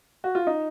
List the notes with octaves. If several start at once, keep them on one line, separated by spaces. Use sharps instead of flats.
F#4
F4
D#4